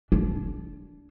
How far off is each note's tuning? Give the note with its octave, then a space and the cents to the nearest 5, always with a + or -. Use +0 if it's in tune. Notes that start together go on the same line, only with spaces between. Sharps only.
D4 -20